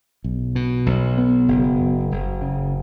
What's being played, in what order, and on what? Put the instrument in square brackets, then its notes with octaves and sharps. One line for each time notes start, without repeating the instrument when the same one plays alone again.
[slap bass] B1
B2
B1
B3
F#1
F#2
F#1
C#3